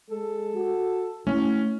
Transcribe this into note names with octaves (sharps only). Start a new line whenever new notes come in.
G#3 A4
F#4
A3 C#4 E4